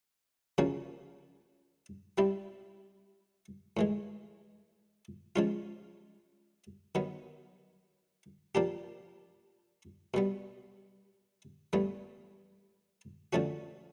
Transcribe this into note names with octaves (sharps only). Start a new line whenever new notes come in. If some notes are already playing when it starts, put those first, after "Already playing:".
C#3 F3 A#3 C#4 F#4
G3 C4 E4 G4
A2 E3 G#3
F3 G#3 C#4 F4
D#3 F#3 B3
F3 A#3 D4 G4
B2 G3 B3
A2 E3 G3 B3
D3 F3 A3 C#4 F#4